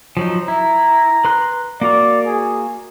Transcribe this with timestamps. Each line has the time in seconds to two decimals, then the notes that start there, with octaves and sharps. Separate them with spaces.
0.17 F3 F#3 D#4
0.48 E4 A#5
1.25 B4 C6 F#6
1.81 A#3 F#4 A#4 D5
2.26 G#4